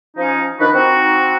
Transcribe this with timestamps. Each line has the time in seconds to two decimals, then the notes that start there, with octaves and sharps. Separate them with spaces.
0.17 F3 C#4 D#4
0.59 D#3 F3 D4 D#4 F#4 B4
0.74 C4 D#4 F#4